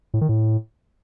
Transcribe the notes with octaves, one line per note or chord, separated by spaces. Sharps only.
A2
D#3
A2